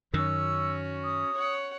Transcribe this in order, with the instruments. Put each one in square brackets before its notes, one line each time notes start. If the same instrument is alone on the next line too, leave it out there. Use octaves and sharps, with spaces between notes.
[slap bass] F#2 D#3 [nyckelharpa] C#4 F#4 [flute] E6
[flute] D#6
[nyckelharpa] C#5 F#5